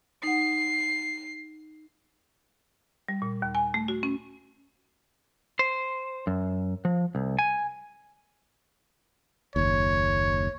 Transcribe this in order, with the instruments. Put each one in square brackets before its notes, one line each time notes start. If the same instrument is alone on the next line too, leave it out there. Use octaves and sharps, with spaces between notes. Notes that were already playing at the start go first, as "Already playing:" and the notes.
[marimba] D#4 F#5 [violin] C7
[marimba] G3
A#2
D#2
G#5
A3
F#4
C#4
[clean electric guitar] C5
F#2
F3
C2
G#5
[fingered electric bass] F#1 D#2 [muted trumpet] C#5